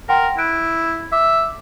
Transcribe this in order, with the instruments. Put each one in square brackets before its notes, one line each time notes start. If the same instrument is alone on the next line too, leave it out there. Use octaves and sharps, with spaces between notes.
[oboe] A#4 [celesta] F#5 G5 C6
[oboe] E4 [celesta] F#6 D7
[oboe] E5 [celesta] D6